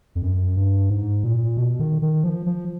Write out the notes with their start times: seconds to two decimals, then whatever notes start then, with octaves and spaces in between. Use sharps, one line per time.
0.15 F2
0.22 F#2
0.56 G2
0.90 G#2
1.23 A#2
1.57 B2
1.80 D#3
2.02 D#3
2.24 F3
2.46 F3